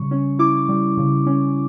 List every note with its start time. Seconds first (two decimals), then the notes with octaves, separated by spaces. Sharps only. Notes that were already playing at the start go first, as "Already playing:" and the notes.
Already playing: C#3 G3 C#6
0.11 C#4
0.39 E4 D6
0.69 G3
0.97 C#3
1.27 C#4